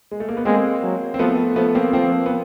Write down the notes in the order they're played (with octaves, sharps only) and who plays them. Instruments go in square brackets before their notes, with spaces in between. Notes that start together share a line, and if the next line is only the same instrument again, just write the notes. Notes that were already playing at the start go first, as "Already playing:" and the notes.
[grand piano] G#3
A3
A#3
B3
[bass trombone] G#3 [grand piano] A#3 C4
[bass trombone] F#3
[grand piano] C4
[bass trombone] F3 [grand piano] A3 B3
[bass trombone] F3 [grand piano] A3 B3
[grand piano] A#3 C4
[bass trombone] F3 [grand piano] A#3 C4
[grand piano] B3